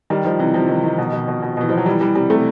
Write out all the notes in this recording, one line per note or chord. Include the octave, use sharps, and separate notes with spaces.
D#3 G3
D#3 F3
C3 E3
C3 F3
D#3
D#3
B2
B2
B2
B2
B2 E3
B2 F3
F#3
E3 G3
E3 G3
C3 G3
C3 A3